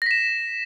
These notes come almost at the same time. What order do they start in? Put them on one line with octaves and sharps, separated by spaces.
A#6 B6 E7